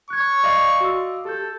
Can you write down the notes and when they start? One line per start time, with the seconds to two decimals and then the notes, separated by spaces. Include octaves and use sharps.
0.10 C#6 F#6 G#6
0.44 D5 D#5 F5
0.80 F#4 E6
1.25 G4 A4 G6